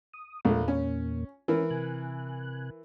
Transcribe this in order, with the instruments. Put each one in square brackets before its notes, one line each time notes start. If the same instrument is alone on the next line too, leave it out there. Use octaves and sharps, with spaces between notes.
[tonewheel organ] D#6
[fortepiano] A#1 A3 [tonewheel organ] E2 A#2 A#3
[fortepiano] C#4
[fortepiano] E3 E4 A#4 [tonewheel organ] C#4
[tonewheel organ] C3 G#5 F#6